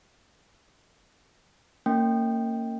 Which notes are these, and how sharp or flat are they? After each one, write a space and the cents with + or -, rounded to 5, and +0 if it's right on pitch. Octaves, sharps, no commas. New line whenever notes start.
A#3 -25 C#4 +0 G5 +0